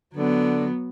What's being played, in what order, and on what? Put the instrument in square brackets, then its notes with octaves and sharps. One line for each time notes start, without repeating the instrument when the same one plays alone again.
[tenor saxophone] D3 [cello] F#3 B3